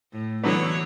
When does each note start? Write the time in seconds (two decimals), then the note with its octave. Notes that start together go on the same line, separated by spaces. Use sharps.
0.12 A2
0.43 D3 E3 F#3 B3 E4 C#5